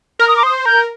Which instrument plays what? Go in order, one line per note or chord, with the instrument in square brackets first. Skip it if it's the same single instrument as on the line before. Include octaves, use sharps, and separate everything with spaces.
[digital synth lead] A#4 [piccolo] F6
[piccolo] D#6
D6
[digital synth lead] C5 [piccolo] D#6
[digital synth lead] A#4 [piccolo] G6